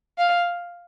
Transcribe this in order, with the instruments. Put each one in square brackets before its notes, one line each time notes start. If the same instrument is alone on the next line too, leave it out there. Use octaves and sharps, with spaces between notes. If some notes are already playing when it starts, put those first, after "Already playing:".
[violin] F5